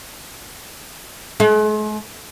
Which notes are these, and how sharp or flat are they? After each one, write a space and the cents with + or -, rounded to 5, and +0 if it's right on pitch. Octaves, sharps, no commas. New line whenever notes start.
G#3 +45